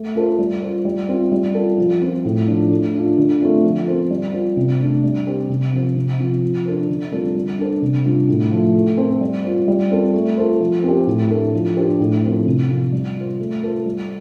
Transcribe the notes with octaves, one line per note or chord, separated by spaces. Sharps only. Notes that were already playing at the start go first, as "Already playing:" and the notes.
Already playing: A3
F4 A4 C5
G3
F4 C5
G3
C4 F4
G3
F4 A4
F3
C4 F4 C5
A2
F3 D4
A3
D4 F4
D3
A3 C4 F4
F3
C4 A4 C5
G3
F4 C5
C3
A3 D4
G3
C4 G4 C5
C3
F3 C4 F4 C5
C3
F3 C4 F4
F3
D4 A4 C5
D3
G3 C4 F4 A4
G3
D4 A4 C5
C3
G3 D4 F4
A2
F3 A3
A3
C4 A4
G3
F4 C5
G3
C4 F4 A4
A3
F4 A4 C5
F3
C4 G4
A2
A3 D4 A4
F3
D4 G4 C5
A2
F3 C4 A4
C3
F3 C4 F4
G3
F4 C5
A3
F4 A4 C5
G3